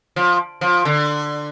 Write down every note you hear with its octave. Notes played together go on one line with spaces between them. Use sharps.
F3
F3
D3